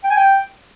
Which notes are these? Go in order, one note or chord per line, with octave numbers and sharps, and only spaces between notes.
G5
G#5
G5